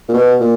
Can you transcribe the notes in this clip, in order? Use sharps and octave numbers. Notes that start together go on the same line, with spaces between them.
A#2
B2
A#2